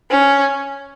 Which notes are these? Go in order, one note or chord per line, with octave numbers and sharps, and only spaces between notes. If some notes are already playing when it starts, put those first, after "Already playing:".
C#4